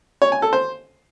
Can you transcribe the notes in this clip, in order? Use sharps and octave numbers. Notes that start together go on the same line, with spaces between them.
C#5
G#5
A4
C5